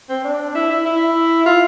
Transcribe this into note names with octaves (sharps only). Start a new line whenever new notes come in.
C4
D4
E4
E4
E4
F4